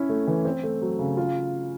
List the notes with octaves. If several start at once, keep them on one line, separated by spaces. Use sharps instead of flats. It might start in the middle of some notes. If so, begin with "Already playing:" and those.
Already playing: C#4 E4
A3
E3
C4
A3
F#3
C#3
F4